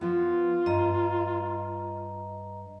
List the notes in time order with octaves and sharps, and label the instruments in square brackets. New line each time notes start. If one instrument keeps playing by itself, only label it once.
[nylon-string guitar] F3 B3 [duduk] F4
[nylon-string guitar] G2 [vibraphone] D#5 A#5